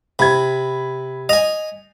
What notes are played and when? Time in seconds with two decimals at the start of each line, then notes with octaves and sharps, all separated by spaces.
0.19 C3 B5 G#6
1.29 D#5 G#5 F7